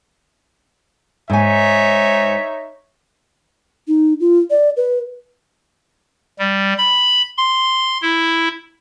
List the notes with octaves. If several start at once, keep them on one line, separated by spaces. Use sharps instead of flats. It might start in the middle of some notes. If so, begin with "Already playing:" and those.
G#2 D#4 C#5 E5 G#5
D#4
F4
D5
B4
G3
B5
C6
E4